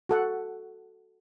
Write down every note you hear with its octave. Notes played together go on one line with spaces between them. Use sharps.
F#4 A4 F#5